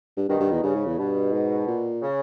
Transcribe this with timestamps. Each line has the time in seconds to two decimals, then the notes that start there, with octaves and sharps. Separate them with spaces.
0.17 G2
0.28 G2 B2 D#3
0.39 G2
0.52 E2
0.63 G2 C#3
0.75 G#2
0.86 E2
0.98 G2 B2
1.33 G#2
1.67 A#2
2.01 C#3